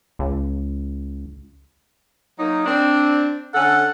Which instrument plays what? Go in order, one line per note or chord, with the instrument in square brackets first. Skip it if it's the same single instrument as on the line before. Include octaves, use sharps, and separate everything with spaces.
[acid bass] C#2
[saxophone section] F#3 A#3 D#4
C4 D4
[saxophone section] D3 C#4 A4 [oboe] F#5